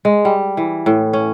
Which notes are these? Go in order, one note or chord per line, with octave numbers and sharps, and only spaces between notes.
G#3
G3
E3
A2
C#4